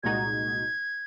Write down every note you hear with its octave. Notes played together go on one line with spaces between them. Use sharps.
C2 A#2 G#3 D#4 F#4 G#6